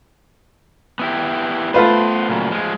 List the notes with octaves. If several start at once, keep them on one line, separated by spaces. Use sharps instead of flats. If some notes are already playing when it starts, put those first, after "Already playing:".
B3 E4 G4
A3 B3 F4 B4 C5
A#2 C#3 F#3
F3 G#3